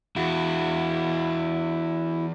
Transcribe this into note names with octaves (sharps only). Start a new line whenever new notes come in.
E2 E4 F#4